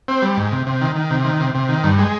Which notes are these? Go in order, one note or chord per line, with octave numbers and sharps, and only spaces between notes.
C4
G3
G#2
C3
C3
D#3
D#3
C3
D#3
C3
C3
D#3
G2
G#3